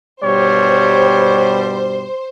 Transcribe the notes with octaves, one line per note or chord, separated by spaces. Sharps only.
G2 B2 G3 C5 C#5